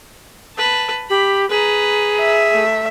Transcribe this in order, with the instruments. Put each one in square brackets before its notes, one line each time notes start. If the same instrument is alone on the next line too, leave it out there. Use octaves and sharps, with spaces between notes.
[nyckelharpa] B4 A5
[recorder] G4 [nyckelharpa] B5
[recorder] G#4 [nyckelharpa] B4 A#5
[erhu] E5
[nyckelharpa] A3